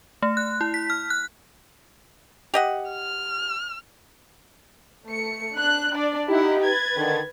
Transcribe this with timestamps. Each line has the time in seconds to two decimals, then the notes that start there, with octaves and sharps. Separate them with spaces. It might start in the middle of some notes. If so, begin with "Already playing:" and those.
0.22 A3
0.37 F#6
0.61 E4
0.74 B6
0.90 F6
1.10 F#6
2.54 G4 D#5 F#5
2.91 F6
5.06 A3 C#7
5.56 D4 F#6
5.94 D4 D5
6.29 D#4 E4 G4 F#5
6.62 B4 G#6 A6
6.96 D3 D#3